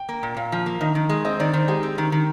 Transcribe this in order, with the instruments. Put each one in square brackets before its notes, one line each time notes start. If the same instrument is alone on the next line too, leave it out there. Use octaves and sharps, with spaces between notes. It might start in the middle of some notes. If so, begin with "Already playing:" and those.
Already playing: [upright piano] G5
[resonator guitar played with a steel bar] A#3
A#2
[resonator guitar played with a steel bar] A#2 [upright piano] F5
[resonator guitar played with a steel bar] F3
A#3
[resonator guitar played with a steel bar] D#3 [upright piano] D#5
[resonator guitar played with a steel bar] D#3
G#3
[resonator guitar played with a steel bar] C4 [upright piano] D#5
[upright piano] C5
[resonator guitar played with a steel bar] D#3 [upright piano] D5
[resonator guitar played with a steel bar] D#3 [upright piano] C5
[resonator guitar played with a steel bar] G#3 [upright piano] G4
[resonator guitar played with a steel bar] C4
D#3
D#3